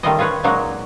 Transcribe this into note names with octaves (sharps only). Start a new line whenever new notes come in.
D#3 G3 A3 F4 D5 D#5
F4 G#4 B4 C#5
A#2 F#3 G#3 A#3 D#4 F#4